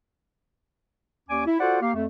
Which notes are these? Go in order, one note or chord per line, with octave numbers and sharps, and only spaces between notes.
D#2 C#4 D5 G#5 D6
E4
F4 F#4 A4 C5 D5 F#5
A#3 G4 F5
F2 A3